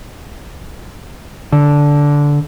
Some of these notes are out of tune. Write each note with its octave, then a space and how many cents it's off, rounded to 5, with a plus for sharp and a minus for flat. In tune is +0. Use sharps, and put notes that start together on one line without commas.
D3 -10